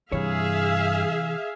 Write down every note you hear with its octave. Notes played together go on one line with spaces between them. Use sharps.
G2 C3 E3 G#4 C#5 E5 F5